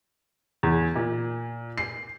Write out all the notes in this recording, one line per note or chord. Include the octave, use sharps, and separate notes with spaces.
E2
A#2
C7